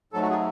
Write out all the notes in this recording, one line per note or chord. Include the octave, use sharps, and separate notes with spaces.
G#2 F#3 A3 A4
F#4
G#4